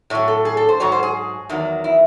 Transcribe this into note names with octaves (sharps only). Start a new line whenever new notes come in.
A2 F#3 C#5
A4
G#4
A4
C5
G#2 F#3 C#5
C5
G#4
E2 D#3 F#3
E4